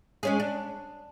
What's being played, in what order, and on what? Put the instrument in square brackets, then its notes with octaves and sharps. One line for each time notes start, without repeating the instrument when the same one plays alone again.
[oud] G#3 C#4 G#4
D4